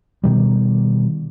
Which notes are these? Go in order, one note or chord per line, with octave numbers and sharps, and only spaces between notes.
B2 D#3 G3